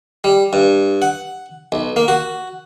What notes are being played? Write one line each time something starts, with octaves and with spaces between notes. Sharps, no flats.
G3
G2
F#5
B1
A#3
F#4